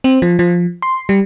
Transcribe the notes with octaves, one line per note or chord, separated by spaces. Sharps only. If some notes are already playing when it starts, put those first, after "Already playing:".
C4
F3
F3
C6
G3